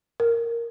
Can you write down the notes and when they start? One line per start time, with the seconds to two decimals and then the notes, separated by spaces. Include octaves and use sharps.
0.20 A#4